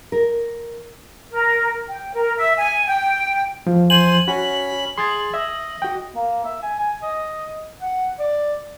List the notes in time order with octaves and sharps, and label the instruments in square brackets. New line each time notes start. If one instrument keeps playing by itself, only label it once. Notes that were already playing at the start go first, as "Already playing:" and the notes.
[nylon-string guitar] A#4
[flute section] A#4
G5
A#4
E5
G#5
G5
[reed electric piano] E2 F3
[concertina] C5 G#5 [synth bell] F#7
[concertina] C#4 B5 [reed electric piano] F#4
[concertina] G#4 [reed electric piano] C6 G#6 A6
[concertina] D#5 [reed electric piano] E5
[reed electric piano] F#4 G5
[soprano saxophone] A#3
E5
G#5
G#5
D#5
F#5
D5